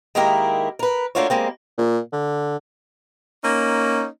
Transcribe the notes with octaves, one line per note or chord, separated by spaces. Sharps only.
D#3 G#3 A#3 E4 G4 A#4
A#4 B4
A3 A#3 D4 F4 F#4 C#5
G3 G#3 A#3 C4
A#2
D3
A#3 C#4 D#4